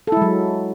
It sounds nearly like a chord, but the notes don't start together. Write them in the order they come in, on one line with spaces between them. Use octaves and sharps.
A4 E4 G#3 F#3